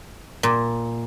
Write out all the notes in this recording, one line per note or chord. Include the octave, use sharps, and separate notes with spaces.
A#2